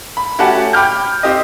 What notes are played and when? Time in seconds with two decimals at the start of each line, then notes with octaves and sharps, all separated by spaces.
0.17 B5
0.38 A3 C#4 F#4 G4 F#5 A5
0.73 G5 B5 D6 F6 G6
1.23 C4 G4 D#5